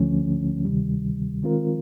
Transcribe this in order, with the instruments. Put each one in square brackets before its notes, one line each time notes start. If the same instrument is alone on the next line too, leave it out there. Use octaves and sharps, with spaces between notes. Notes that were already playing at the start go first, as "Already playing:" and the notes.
Already playing: [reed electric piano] D2 D3 F3 A3 C#4
D2 C3 D#3 G3
D#3 G#3 C4 F4 A#4